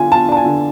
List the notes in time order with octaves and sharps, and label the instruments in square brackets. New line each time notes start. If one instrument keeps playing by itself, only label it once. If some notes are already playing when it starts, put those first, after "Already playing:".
Already playing: [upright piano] D3 D4 F4 G#5
F4 A5
D4 A5
G#5
D3